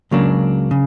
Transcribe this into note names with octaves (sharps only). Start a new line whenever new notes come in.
C#2 C#3 F#3 A#3 D4
C#3